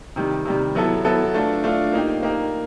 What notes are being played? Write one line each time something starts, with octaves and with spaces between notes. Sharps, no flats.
C3 D#3 G3
C3 D#3 G3
F#3 B3 E4 A4
F#3 B3 E4 A4
A3 D4 F4
A3 D4 F4
A#3 D#4 G4
A#3 D#4 G4